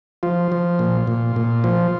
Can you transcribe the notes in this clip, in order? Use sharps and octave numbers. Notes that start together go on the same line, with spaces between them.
F3 F4
F3
A#2
A#2
A#2
F3